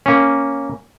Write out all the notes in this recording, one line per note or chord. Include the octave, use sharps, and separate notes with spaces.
A#3 C#4